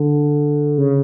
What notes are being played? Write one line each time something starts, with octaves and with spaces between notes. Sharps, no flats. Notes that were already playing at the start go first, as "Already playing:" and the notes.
Already playing: D3
C#3